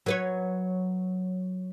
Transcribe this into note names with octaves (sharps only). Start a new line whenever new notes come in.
F#3 B4 C#5